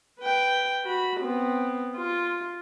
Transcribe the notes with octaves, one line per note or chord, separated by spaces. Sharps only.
B4 G5
F#4 B5
B3 C4
F4